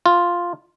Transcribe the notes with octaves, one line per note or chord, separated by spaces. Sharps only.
F4